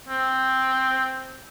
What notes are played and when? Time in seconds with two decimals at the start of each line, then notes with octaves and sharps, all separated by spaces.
0.08 C4